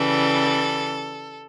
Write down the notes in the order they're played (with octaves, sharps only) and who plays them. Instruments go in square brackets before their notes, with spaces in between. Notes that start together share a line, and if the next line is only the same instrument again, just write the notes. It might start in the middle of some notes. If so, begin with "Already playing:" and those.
Already playing: [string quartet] C#3 E3 G3 A4